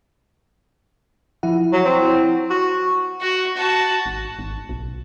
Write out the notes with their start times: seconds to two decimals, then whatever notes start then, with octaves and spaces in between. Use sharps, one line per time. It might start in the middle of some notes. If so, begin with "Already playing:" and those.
1.43 F3 E4 F#5
1.73 F#3
1.85 C4
2.50 F#4
3.21 F#4
3.57 F#4 A5
4.06 G#1
4.39 G#1
4.69 B1